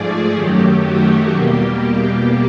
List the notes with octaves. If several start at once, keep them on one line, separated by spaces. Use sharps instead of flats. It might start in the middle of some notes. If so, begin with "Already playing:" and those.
Already playing: G#2 F3 A3 G#4 D5
F#2 D#3 F#3 A3 G4
F#4
E2 B2 G3 A#3 G4